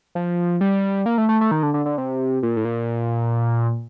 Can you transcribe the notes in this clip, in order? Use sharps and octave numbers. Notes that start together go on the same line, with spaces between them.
F3
G3
A#3
A3
A3
A3
D#3
D3
D3
D3
C3
A#2
A2
A#2